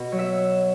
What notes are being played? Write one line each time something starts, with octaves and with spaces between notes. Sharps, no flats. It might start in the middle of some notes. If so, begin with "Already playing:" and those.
Already playing: B2
F#3
E5